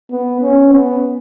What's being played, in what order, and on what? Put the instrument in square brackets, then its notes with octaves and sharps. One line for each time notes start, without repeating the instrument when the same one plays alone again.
[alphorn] B3
C#4
B3